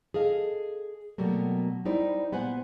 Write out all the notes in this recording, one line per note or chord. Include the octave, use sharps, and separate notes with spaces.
G#4 A4 D#5 F5
B2 F#3 G3 A3 A#3
G3 D#4 E4 C5 D5
A#2 B3 B4 C5 F#5 G#5